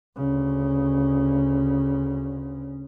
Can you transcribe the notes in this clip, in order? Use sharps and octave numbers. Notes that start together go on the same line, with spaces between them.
D2 C#3